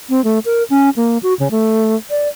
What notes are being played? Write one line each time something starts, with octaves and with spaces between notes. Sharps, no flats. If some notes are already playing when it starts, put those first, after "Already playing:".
C4
A3
A#4
C#4
A#3
F#4
C#3
A3
D5